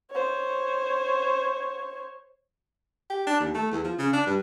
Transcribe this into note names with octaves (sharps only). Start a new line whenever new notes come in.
C5 C#5
G4
D4
D#2
A3
E2
F3
C#3
D4
G2